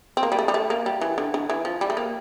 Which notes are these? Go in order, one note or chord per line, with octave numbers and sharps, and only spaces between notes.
C4
A#3
G3
A3
G3
A3
A#3
G3
E3
D3
D3
E3
F3
G3
A3
A#3